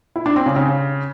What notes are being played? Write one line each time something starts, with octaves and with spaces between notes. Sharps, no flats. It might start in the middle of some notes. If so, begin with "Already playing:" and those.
E4
D4
C4
C#3
C#3